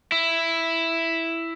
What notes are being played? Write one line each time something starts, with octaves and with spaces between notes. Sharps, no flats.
E4